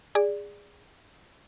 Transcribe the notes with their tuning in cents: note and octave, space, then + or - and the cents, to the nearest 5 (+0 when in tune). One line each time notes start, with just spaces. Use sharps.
G#4 -20 D5 +0